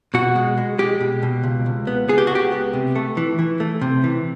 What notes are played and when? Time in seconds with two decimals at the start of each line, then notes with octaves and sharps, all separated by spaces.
0.14 B2 F#4
0.36 G#3
0.58 G#3
0.78 G#3 G4
1.01 B2
1.23 B2
1.43 C#2
1.66 C#2
1.87 B3
2.08 B3 G#4
2.18 G4
2.27 F#4
2.30 C#2
2.35 G4
2.52 B3
2.74 C3
2.95 A3
3.17 E3
3.39 E3
3.60 A3
3.81 C3
4.04 E3